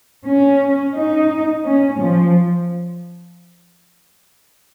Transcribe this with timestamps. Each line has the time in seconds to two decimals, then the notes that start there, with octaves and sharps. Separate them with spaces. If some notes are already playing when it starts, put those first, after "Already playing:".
0.24 C#4
0.94 D#4
1.64 C#4
2.00 F3